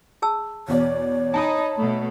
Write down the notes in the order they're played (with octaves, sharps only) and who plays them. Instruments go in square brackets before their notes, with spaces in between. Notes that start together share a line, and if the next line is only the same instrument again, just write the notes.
[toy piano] G#4 A5 E6
[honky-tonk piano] E2 B2 D5 [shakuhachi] C#5
[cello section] D#4 [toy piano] G#5 [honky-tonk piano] A5 B5 D#6
[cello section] B2 A3